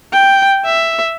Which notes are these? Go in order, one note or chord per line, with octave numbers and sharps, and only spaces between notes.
G5
E5